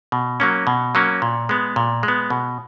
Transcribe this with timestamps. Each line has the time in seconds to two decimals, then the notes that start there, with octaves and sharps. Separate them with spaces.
0.12 B2
0.40 F#3 A#3 C#4
0.67 B2
0.95 F#3 A#3 C#4
1.22 A#2
1.49 G#3 B3
1.76 A#2
2.03 G#3
2.08 B3
2.30 B2